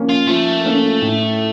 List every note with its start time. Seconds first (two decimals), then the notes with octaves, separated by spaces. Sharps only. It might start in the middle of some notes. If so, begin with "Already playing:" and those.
Already playing: F3 A#3 C#4
0.09 F4
0.27 F3 A3
0.64 A#3 C#4
1.02 A2